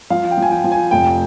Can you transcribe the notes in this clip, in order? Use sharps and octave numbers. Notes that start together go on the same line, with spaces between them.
F3 F5
G5
F3 G#5
G5
F3
G#5
F1 G5